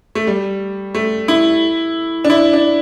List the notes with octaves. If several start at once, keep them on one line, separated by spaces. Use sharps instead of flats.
A3
G3
A3
E4
D4
E4
D4